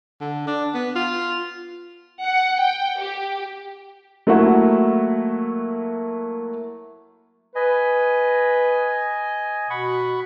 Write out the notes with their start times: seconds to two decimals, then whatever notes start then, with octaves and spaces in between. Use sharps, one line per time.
0.21 D3
0.47 D4
0.74 B3
0.96 F4
2.23 F#5
2.61 G5
3.00 G4
4.27 F#3 A3 A#3 E4 E5 F#5
7.55 B4 D#5 G#5
9.70 B2 F#5 B5 C#6